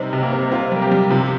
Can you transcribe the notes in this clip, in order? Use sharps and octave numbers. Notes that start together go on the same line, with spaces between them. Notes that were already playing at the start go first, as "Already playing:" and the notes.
Already playing: C3 G3 C4 D#4
C3
A#3
C4
C4 F4
G3 A#4
G4
G3
C3 F3